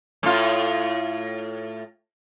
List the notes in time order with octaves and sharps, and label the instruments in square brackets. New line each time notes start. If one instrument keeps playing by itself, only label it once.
[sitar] A2 F4